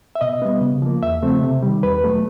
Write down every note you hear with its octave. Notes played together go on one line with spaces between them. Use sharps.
E5
B2 D#5
G3 B3
C#3
F3 A#3
E2 E5
C#3 F3 A3 C4
C3
D#3 G3
E2 B4
B2 F#3 A3